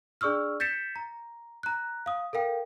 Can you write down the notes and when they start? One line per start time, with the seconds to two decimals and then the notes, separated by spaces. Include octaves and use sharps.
0.21 D4 G#4 D5 C#6 E6 F6
0.60 G6 A6 B6 C#7 E7
0.96 A#5
1.63 A#5 F#6
2.06 F5 D#6
2.33 A4 A#4 F5 G5